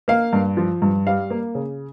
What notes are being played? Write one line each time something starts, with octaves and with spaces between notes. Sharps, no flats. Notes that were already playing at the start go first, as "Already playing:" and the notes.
A#3 F5
G2
F3
G2
G3 F5
A#3
C#3